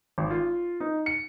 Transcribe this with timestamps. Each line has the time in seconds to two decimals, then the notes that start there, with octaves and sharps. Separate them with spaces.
0.18 G#1
0.30 F4
0.80 D#4
1.06 C#7